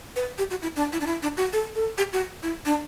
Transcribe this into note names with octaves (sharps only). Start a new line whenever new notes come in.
B4
G4
F#4
E4
D4
E4
D4
E4
D4
F#4
A4
A4
G4
F#4
E4
D4